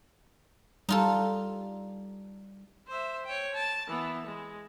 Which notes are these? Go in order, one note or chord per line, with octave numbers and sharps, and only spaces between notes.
G3 D#4 F4 A4
C5 E5
C#5 G5
A5
E3 B3
G#3